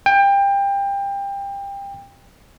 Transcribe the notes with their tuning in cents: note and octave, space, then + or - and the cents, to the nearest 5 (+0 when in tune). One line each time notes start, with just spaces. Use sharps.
G5 +25